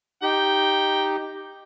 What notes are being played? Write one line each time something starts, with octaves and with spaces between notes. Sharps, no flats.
D#4 G4 G5